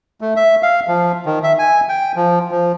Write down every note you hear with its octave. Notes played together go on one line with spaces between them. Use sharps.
A3
E5
F5
F3
D#3
E5
G#5
G5
F3
F3